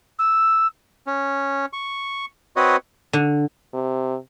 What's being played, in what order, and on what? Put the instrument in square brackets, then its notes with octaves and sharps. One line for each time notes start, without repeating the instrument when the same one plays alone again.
[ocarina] E6
[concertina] C#4
C#6
C4 F#4 B4 C#5 D#5
[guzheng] D3
[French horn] C3